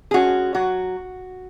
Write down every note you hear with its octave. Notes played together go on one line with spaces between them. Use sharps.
G#4
G#3 C#4 F#4
F#3 F#4